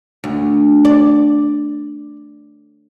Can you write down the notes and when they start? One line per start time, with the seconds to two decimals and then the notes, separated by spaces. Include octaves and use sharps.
0.24 D2
0.85 D5